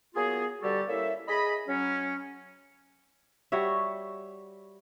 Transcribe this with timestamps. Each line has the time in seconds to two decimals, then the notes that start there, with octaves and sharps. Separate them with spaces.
0.14 F#3 A#3 B3 F4 G#4
0.61 B2 D3 G3 F#4 G4 A4
0.87 A#3 C#4 E4 A4 E5
1.28 G#4 D#5 B5
1.67 F#3 C#4
3.52 G3 F#4 C#5 E5